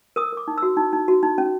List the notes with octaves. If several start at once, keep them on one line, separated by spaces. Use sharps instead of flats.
A#4 D#6
A#4 D6
D#4
F#4 E6
D#4
D#4
F#4
D#4
C#4